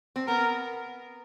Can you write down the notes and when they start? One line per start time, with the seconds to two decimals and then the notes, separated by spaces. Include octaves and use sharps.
0.16 C4
0.28 B3 A#4